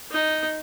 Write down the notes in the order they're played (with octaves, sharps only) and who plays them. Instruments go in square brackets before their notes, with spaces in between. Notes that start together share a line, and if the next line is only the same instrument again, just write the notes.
[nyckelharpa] D#4